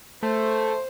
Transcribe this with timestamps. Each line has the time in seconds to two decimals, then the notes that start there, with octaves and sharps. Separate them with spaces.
0.23 A3 C5